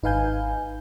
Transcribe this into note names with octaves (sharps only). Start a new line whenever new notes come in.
G#1 D#4 B4 F5 G#5 G6